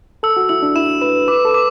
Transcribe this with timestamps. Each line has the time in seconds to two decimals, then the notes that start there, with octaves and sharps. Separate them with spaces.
0.23 A4 E6
0.37 F#4
0.49 E4 E6
0.62 D4
0.76 E4 E7
1.01 B4 E7
1.28 B4 D6
1.45 A4
1.54 D6